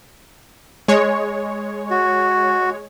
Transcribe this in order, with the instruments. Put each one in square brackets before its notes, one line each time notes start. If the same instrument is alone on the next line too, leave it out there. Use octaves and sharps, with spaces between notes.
[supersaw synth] G#3 C#5
[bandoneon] F#4